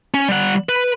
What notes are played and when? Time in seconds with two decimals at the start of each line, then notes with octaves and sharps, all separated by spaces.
0.14 C#4
0.28 G3 F#5
0.69 B4